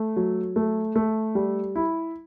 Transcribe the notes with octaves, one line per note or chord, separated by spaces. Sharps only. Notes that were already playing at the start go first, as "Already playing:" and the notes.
Already playing: A3
F#3
A3
A3
G3
E4